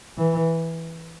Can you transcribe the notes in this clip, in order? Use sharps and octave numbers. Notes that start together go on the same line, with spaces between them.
E3